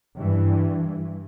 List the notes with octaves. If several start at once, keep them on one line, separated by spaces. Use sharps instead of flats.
G2 E3